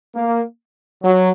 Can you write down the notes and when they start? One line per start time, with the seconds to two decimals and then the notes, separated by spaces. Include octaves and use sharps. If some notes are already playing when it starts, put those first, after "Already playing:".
0.15 A#3
1.02 F#3